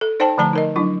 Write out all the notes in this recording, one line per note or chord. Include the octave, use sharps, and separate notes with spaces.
A4
D#4 C5 D5 G5 A5
D3 F3 A3 D5 A5 A#5
D#4 A#4 D#5
F#3 D4 E4